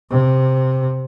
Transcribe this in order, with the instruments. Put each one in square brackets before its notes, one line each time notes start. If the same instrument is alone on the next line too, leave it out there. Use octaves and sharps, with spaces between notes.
[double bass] C3